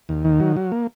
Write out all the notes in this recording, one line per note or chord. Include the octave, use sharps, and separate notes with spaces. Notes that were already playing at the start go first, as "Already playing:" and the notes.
D#2
D#3
F#3
F#3
A#3